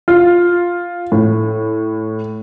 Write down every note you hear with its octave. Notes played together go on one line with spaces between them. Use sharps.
F4
A2